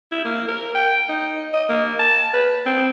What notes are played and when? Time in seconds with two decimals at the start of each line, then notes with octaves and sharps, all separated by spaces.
0.12 E4
0.25 A#3
0.48 A#4
0.75 G5
1.09 D#4
1.53 D#5
1.69 A#3
1.99 A5
2.34 B4
2.66 C4